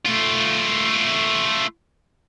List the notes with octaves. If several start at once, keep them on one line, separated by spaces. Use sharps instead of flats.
A3 F4